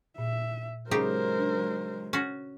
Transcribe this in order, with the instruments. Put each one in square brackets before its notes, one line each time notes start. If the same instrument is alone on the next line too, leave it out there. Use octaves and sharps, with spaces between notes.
[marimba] A#2 [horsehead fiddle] E5
[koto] C#3 D#4 G4 [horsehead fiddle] F#3 G#3 [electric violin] A#4 C5
[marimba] D4
[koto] C#4 F#4